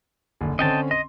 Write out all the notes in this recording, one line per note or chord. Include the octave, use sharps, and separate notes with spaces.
F#1 D3
D3 C4 C#4 D#5 G5 A5
D#5 C6